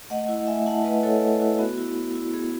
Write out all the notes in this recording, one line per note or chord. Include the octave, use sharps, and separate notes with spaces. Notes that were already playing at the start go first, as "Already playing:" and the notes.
A3 D#5 F#5
E4
A3 E5 G#5
E4 F#5 A5
A3 B4 D#5
E4 A4 C#5
A3
E4
B3 F#4
E4
B3
E4
B3 G#4